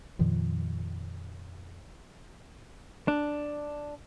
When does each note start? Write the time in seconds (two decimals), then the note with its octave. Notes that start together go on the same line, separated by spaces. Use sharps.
0.19 F2 A#2 D#3 F3
3.08 D4